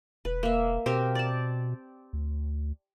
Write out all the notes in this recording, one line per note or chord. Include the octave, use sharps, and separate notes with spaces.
E1 B4
A#3 E5
B2 C4 G4 A#4
D5 A5
D2